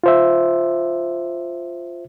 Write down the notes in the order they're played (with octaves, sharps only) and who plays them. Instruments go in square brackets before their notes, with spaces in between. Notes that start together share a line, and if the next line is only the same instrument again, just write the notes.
[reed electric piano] F4 C5 E5